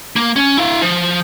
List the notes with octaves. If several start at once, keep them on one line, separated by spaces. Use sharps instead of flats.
A#3
C#4
E4 F5
F3